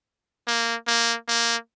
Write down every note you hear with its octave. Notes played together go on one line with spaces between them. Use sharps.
A#3
A#3
A#3